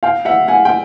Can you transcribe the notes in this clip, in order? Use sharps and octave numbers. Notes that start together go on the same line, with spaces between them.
F5 G5
E5 F#5
F#5 G#5
G5